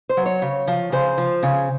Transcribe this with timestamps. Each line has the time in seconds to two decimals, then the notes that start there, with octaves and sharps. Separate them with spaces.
0.09 C5
0.17 F#3
0.26 C#5
0.42 C#3
0.68 F3
0.92 C#3 C5
1.18 F3
1.43 C#3